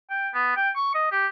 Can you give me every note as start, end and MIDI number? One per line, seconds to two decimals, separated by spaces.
0.10 0.29 79
0.34 0.51 59
0.56 0.70 79
0.76 0.91 85
0.94 1.07 75
1.12 1.27 67